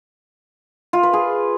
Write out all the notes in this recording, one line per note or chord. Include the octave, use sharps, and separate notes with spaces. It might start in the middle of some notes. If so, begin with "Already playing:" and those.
F4
B4
G#4